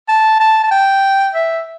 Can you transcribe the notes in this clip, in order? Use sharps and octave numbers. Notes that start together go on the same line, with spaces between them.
A5
A5
A5
G5
E5